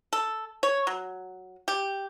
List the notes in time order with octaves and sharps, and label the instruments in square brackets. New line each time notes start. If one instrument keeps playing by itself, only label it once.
[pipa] A4
C#5
F#3
G4